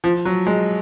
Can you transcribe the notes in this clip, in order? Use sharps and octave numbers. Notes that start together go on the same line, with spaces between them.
F3
F#3
G#3